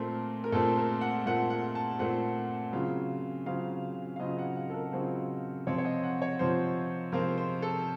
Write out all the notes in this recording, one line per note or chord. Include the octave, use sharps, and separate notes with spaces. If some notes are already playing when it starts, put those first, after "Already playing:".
Already playing: A#2 A3 C4 A#4
A#4
A#2 A3 C4 A4
A#4
F#5
A#2 A3 C4 F#5
F#5
A5
A#2 A3 C4 F#5
C#3 F#3 C4 F4
C#3 F#3 C4 F4 F5
F5
C#3 F#3 C4 F4 D#5
F#5
F#5
A4
A#4
C#3 F#3 C4 F4 C5
C3 F3 C4 F4 C#5
C#5
D#5
F#5
C#5
C3 F3 C4 F4 C5
C3 F3 C4 F4 A#4
C5
A4